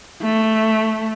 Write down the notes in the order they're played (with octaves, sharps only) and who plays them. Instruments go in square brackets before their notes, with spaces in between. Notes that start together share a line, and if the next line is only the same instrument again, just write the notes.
[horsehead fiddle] A3